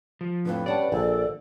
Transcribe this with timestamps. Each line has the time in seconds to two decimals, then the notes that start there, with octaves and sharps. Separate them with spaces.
0.21 F3
0.45 F2 A2 D3 B4
0.66 G3 C#4 C#5 D5 F#5 A5
0.92 A#1 D3 A4